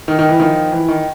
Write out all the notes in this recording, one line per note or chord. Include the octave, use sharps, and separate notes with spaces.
D#3
D#3
E3
D#3 F3
E3
D#3